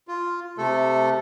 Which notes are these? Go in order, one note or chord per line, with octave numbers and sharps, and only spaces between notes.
F4
C3 A3 A4